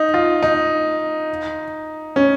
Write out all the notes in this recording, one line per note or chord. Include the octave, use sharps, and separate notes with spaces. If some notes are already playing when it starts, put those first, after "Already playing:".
Already playing: D#4
F4
D#4
C#4